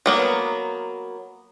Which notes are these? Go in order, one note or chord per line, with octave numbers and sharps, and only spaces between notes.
F#3 A#3 B3